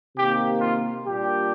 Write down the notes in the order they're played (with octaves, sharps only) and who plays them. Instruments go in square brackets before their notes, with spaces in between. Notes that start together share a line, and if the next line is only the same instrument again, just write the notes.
[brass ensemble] C3 D#3 A#3 G4
F4
A#2 G3 A#3 D4 G4